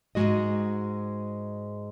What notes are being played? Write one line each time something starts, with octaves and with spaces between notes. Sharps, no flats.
G#2 B2 G#3 F#4 D#5